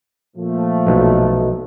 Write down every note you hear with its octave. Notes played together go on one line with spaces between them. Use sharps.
A#2 F3 A3
B1